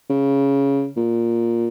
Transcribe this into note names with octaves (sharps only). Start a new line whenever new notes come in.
C#3
A#2